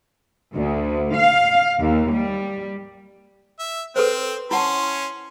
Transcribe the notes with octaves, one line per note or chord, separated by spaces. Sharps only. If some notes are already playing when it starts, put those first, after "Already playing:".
D2
F5
D#2
G3
E5
C4 A4 B4 C5 G5
C#4 E4 F#5 A5 C6